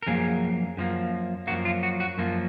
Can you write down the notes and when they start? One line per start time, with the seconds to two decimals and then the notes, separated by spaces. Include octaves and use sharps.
0.03 A#4
0.07 F#2 F3 A#3 G#4
0.77 F#2 F3 A#3
1.47 F#2 F3 A#3 F#4
1.65 F4
1.83 F#4
2.00 F#4
2.18 F#2 F3 A#3